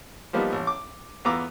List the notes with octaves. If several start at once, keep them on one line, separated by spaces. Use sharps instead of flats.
F3 G3 A#3 B3 D#4
A1
D6
E2 B3 F4 A#5 D6 E6